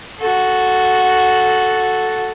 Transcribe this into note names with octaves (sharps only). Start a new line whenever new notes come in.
F#4 A4